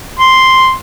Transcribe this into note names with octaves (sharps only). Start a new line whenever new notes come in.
C6